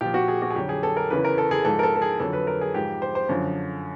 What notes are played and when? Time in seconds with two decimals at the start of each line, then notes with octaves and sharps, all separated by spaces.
0.01 A#2 F3 G4
0.14 F#4
0.28 G#4
0.42 F#4
0.50 G#4
0.56 F2 D3 F#3 G4
0.69 G#4
0.83 A4
0.97 A#4
1.10 E2 C#3 E3 B4
1.24 A#4
1.38 A4
1.51 G#4
1.65 G#2 F3 A4
1.79 A#4
1.83 A4
1.96 A4
2.02 G#4
2.20 F2 D3 F#3 A4
2.33 B4
2.47 A#4
2.61 G#4
2.75 G#2 F3 G4
3.02 C5
3.15 C5
3.29 F#2 D3 F3